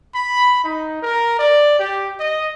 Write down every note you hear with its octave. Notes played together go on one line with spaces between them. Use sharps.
B5
D#4
A#4
D5
G4
D#5